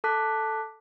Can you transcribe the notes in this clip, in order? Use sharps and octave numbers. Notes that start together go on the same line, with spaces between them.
A4 A5 D6 F#6 B6